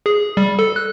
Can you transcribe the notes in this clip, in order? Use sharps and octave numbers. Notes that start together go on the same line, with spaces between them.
G#4
G3
A4
F#6